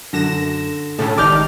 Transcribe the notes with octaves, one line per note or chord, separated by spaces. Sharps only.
F#2 D3 A#6 E7
A2 C#3 F3 A4
G#1 D#3 D#4 G4 D5 D6 F6 G6